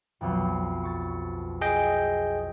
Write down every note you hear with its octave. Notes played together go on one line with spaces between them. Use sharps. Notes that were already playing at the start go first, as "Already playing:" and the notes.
B1 F2
C#6 A6
G#4 D#5 G5